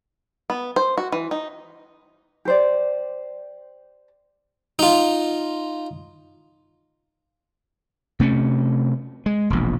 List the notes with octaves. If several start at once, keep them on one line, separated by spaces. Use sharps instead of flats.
B3
C5
F#4
E3
D#4
G4 C5 D5
D#4 F4
C3 A3 C#4
G#3
E1 A#1